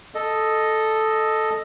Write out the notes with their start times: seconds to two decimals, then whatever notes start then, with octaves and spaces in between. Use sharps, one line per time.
0.15 A4 D#5